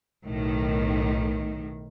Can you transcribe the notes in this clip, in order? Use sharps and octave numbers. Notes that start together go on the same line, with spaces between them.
B1 A2 D#3